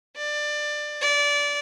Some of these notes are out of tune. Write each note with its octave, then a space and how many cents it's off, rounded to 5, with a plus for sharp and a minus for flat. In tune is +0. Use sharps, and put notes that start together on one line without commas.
D5 +20
D5 -20